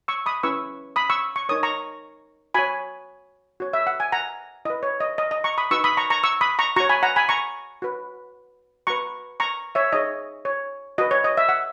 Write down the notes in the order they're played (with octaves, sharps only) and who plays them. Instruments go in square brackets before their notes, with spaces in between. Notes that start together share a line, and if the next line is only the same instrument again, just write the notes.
[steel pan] C#6 E6
B5 D#6
C#4 E4 B4 C#6 E6
B5 D#6
C#6 E6
C#6
D#4 A#4 C#5 D#6
A#5 C#6
F#4 C#5 G#5 B5
F#4 C#5
E5
F#5
G#5
F#5 A#5
E4 B4 D#5
C#5
D#5
D#5
D#5
A#5 C#6
B5 D#6
D#4 F#4 B4 C#6 E6
B5 D#6
A#5 C#6
A#5 C#6
C#6 E6
B5 D#6
A#5 C#6
F#4 C#5 A#5 C#6
G#5 B5
F#5 A#5
G#5 B5
A#5 C#6
F#4 B4
F#4 B4 A#5 C#6
A#5 C#6
C#5 E5
D#4 G#4 C#5 D#5
C#5
F#4 B4 D#5
C#5
D#5
E5
F#5